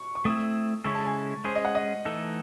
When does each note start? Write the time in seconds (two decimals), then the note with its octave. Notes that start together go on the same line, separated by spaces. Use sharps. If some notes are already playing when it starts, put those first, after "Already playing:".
Already playing: C#6
0.15 C#6
0.25 A3 C4 E4 D#6
0.84 C#3 G#3 C#4 E4 A4 C#6
0.95 A5
1.05 G#5
1.44 G#3 C#4 G#4 C5
1.55 D#5
1.65 F#5
1.75 D#5
2.05 E3 A3 D#4 A4